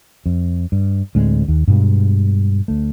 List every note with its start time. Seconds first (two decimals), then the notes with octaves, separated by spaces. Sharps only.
0.26 F2
0.72 G2
1.15 D2 A2 G#3 C4
1.48 D#2
1.68 G2 B2 G#3
2.68 D2 A3